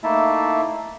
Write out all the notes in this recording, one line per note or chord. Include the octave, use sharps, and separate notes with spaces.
A3 A#3 D#4 E4 E5 A5